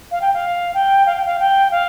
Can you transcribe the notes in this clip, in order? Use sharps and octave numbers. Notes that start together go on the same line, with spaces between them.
F5
G5
F5
G5
F5
G5
F5
G5
F5